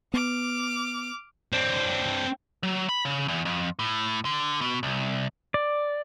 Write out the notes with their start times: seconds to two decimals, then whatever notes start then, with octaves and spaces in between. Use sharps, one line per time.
0.14 B3 D6 F6
1.53 C4 D4
2.63 F#3
2.89 B5
3.05 C#3
3.28 E2
3.45 F2
3.79 A2
4.25 D3
4.62 B2
4.83 C2
5.54 D5